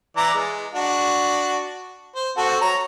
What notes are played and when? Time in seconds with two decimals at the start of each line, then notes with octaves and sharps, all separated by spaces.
0.17 E3 D5 A#5
0.34 G#3
0.74 D4 F#4
2.15 C5
2.37 C4 F#4 A4
2.61 C#5 A#5